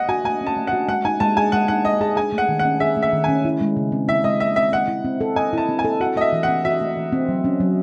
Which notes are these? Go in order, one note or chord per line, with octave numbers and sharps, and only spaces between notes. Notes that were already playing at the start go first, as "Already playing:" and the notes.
Already playing: D#5 F#5
F#4 G#5
A3 G#5
C#4
A5
A3
F#5
F#4
G#3 F#5
D#4 G#5
G#3 A5
G#4 G#5
G#3 F#5
D#4 F#5
G#3 D#5
G#4 A5
G#4 G#5
A3
F#5
D#3
F#5
C#4
G#4 E5
A3
E5
D#3
C#4 G#5
E4
G#3
C#3
C4
E4 E5
G#3 D#5
C#3 E5
C4 E5
D#5 F#5
E4
C4
A4
D#5 G#5
E4 A5
C4
G#5
A4
F#4 F#5
A3 D#5
E5
E3
F#5
C4
F#4 E5
A3
E3
C4
F#3
C#4
F#3